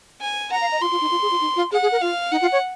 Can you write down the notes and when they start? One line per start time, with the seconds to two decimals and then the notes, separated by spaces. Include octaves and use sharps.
0.21 G#5
0.51 F#5 A#5
0.61 F5
0.72 D#5
0.81 F4 C6
0.91 F4
1.01 D#4
1.11 F4
1.22 G#4
1.31 F4
1.41 D#4
1.56 F4
1.72 G#4 F#5
1.82 G#4
1.92 A#4
2.01 F4 F5
2.32 D#4 F#5
2.42 F4
2.52 C#5